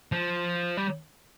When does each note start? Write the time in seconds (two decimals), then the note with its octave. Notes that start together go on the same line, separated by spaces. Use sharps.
0.12 F3
0.77 G3